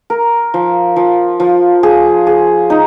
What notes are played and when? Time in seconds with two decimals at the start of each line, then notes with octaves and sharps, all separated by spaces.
0.10 A#4
0.54 F3
0.96 F3
1.40 F3
1.83 G#4
2.27 G#4
2.70 D#4